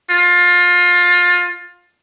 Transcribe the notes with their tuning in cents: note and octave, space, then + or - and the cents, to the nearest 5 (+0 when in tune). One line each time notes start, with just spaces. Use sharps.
F4 +25